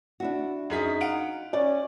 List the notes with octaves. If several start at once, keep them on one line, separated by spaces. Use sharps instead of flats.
D4 E4 F#4
F#2 D#4 G#4 B6
F5 F#5 D7
C#4 D5